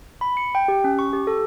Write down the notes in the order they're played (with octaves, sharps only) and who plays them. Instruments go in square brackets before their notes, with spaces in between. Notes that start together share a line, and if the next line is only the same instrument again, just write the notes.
[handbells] B5
C#7
G5
G4
C#4
C#6
G4
A4